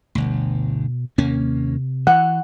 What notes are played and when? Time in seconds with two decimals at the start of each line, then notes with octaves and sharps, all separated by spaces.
0.15 G1 D2 B2
1.18 D#2 C3 A#3 C#4
2.07 E3 F#5